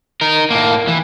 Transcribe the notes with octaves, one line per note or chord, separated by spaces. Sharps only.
D#4 A#4
A2 A#3
E3